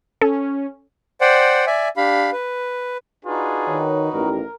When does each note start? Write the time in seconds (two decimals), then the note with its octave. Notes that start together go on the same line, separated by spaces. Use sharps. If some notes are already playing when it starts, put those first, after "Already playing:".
0.22 C#4 A4
1.21 C5 D5 F#5 G5
1.67 D5 E5 G#5
1.97 D4 G4 F5 B5
2.32 B4
3.26 D4 D#4 F4 F#4 G#4 B4
3.68 D#3 C#5
4.13 A1 G2 D#3 G3 A#4